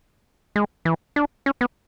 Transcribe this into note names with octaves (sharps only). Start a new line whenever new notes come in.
G#3
E3
D4
C#4
B3